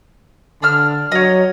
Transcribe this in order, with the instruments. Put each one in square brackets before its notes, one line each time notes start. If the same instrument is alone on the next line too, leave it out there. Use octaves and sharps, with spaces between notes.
[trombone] D3 [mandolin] D4 E6 F6
[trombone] F#3 [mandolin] C#5 D#5